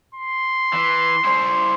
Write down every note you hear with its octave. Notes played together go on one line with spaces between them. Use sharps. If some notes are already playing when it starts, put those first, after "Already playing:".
C6
E3
E4 C5